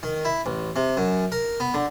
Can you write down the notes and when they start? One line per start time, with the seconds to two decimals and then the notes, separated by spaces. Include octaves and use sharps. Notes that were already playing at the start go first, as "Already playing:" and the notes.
0.03 D#3
0.25 E4
0.46 A1
0.76 C3
0.97 F#2
1.32 A#4
1.60 B3
1.74 D3